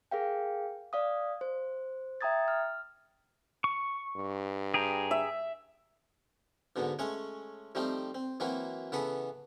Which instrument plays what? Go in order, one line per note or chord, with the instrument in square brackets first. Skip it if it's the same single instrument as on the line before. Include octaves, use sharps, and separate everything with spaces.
[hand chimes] G#4 A#4 F5 G5
D5 F5 D#6
C5
E5 G5 A#5 D#6 G#6 A6
F6
[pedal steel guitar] C#6
[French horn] G2
[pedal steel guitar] G#4 G5 A#5
[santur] E5
[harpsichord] G#2 B2 D3 B3
G#3 A3 C#4 C#5
F3 G3 A3 C4 D#4 F4
C4
E3 F#3 A#3 C4 E4 F#4
C#3 E3 B3 A4 B4 F#5